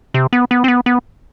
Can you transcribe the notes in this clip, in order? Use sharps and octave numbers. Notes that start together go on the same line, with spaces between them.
C3
B3
B3
C4
B3
B3